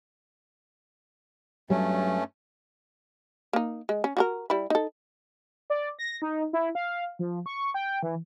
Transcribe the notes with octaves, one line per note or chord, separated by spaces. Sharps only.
G2 F#3 G3 A3 C#4
A#3 D#4
G#3
C#4
F#4 G4 A#4
G3 E4 B5
D#4 A4
D5
A#6
D#4
E4
F5
F3
C#6
G5
E3